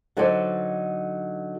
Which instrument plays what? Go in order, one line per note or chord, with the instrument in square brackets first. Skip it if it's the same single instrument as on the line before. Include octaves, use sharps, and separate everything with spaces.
[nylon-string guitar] D3 F#3 D#4 A4 C5 D5